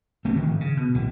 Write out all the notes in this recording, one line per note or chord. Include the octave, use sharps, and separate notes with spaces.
C2 A3 C4 C#4
D3 D#3 F3
G#1
C#3
B2
D1 B1 E3